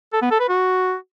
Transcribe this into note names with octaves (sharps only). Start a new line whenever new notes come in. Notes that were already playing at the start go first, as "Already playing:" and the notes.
A4
B3
A4
B4
F#4